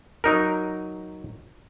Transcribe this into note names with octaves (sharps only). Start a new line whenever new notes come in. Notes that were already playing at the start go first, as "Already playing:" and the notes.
F#3 D#4 A#4